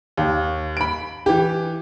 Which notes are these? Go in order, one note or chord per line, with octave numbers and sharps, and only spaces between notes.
D#2
B5 D7
E3 G4